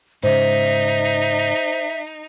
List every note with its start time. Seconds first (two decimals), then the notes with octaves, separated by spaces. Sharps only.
0.23 G#2 C#3 D#4 C5 E5